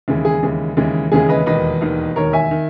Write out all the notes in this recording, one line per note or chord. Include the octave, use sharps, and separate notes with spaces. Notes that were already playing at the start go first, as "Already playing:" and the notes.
D#2 C#3 E3 G#3
G#4
D#2 C#3 E3 G#3
D#2 C#3 E3 G#3
D#2 C#3 E3 G#3 G#4
B4 D#5
E1 D#2 D#3 B4 D#5
E1 D#2 D#3
E1 D#2 D#3 A#4 C#5
E5 G#5
D#3